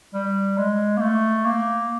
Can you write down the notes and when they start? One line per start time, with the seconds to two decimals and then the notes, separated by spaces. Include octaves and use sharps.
0.14 G3
0.58 G#3
0.97 A#3
1.01 A3
1.45 A#3